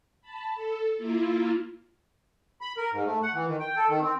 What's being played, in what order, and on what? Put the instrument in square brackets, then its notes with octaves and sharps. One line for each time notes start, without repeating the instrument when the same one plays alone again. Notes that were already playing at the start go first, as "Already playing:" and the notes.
[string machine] A5 B5
A4
A#3 E4 F4
[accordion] B5
A#4
G#2
A3
F#5
E3
D#3
G5
A4
D#3
C4